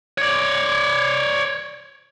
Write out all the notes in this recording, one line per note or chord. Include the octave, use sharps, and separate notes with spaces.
C#5 D5